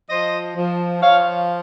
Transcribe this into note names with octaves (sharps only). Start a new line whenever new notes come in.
F3 C5 D#5
F3
F3 C#5 F5